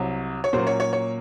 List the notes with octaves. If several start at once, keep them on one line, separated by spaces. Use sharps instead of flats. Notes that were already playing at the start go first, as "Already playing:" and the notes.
Already playing: C2 C3 F#3
C#5
A#2 F#3 A#3 C#4 C5
C#5
C#5
C#5